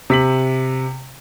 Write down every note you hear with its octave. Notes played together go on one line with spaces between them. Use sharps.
C3 B6 F#7